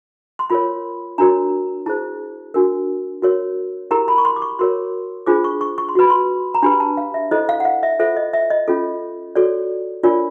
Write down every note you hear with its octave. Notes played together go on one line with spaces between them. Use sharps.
C6
F4 A#4 C#5 B5
D4 F#4 A#4 C#5 A#5
E4 G#4 C5 A5
D4 F#4 A#4
F#4 A#4 C#5
E4 G4 A#4 A#5
B5
C#6
C6
D6
C#6
F#4 A#4 C#5 C6
D4 F4 G#4 C5 D6
C#6
C#6
C#6
C6
F#4 B4 B5
C6
A#5
D4 G4 B4 B5
A5
F5
E5
E4 A4 C5 D#5
F5
F#5
F5
E5
F4 A4 C5 E5
D#5
E5
D#5
C#4 F4 A4
F#4 A4 C#5 D5
D4 F4 A#4 C#5 D5